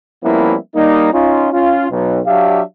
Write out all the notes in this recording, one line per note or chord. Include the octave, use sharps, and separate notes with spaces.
F3 G3 A#3 B3 C#4 E4
G3 A#3 D#4
C#4 D#4 F4
C#4 F4
B1
F#3 D4 G4 E5 F5